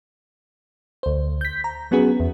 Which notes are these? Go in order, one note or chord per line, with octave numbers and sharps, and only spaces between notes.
D2 C5
G6 B6
A#5
F#3 B3 C#4 F#4 G#4 B4
E2